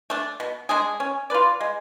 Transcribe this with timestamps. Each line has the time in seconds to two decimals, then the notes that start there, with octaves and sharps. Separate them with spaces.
0.10 A3 D4
0.40 B2
0.69 G#3 D4 G#4
1.00 C#4
1.30 F4 B4 D5
1.61 G#3